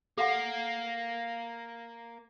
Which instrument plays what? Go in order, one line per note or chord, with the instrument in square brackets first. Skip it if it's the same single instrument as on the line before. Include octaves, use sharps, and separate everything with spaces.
[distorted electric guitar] A#3 [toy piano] A4 F5 F#5